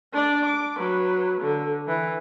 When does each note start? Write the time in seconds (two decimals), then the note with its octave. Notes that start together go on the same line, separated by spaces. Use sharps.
0.13 D4 D5
0.45 D6
0.77 F#3 B4
1.41 D3
1.88 E3